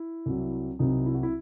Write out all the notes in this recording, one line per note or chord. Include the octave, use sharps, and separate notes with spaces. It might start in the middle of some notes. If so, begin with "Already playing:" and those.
Already playing: E4
C2 C3 F#3
C2 C3 F#3 C4 D#4
E4
F#4
E4